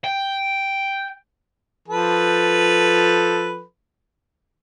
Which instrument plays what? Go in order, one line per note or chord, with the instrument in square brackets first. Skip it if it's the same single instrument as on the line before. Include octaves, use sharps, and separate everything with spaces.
[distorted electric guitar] G5
[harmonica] F3 A4 B4